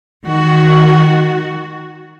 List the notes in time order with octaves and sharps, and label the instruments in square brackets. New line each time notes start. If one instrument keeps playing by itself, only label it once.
[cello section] D#3 F#4